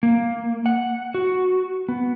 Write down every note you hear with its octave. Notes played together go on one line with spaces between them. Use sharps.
A#3
F#5
F#4
B3